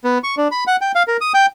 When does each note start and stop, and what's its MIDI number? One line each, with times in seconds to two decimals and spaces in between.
0.04 0.18 59
0.24 0.35 85
0.37 0.48 62
0.51 0.64 83
0.67 0.76 78
0.81 0.92 79
0.95 1.03 77
1.08 1.17 70
1.21 1.32 87
1.34 1.46 79